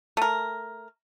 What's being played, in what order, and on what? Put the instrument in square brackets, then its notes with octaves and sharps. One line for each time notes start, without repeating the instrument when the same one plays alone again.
[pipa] A3 A#4